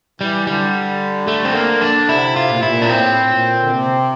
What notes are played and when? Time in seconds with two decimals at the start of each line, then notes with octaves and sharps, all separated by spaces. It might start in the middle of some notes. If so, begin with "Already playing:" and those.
0.20 E3 G3
0.47 D3 G3
1.27 A3
1.45 C4
1.54 A#3
1.81 D4
2.09 C3 E4
2.36 F4
2.49 A#2
2.58 A2
2.63 A#2 E4
2.82 D4
2.89 A2 C4
3.30 A#2
3.61 D3
3.70 C3